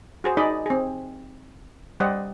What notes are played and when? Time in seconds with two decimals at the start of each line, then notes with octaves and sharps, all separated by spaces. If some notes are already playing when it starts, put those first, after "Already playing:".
0.24 F#4 G#4 C5
0.37 D#4 G#4 D5 D#5 B5
0.66 C4 G#4
2.00 G3 G4 C5 D5 D#5 F#5